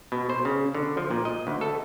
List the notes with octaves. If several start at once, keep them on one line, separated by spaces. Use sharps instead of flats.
B2
C5
C#3
D3
F3
A#2
D#5
D2
A4